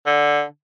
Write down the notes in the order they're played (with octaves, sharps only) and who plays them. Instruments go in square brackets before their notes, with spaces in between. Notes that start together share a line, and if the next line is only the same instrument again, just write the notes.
[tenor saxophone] D3